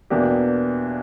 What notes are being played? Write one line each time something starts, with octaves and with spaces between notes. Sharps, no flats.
E2 B2 A#3 D4 G4